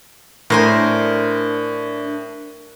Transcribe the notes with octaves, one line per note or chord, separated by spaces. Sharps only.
A2 D4 A#4 C5 G#5